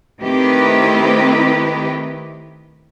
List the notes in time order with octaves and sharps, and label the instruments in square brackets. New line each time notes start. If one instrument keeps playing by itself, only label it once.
[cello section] D#3 A3 C4 E4 G4 B4